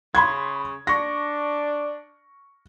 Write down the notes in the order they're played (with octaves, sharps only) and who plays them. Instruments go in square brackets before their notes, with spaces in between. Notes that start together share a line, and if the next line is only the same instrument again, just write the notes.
[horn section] C#3 [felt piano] B5 C6 G#6
[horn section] D4 [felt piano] C#6 A#6